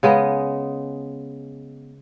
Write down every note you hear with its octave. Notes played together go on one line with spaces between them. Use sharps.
C#3 G#3 B3 D#5